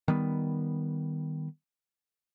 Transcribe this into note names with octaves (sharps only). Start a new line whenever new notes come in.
D#3 G3 B3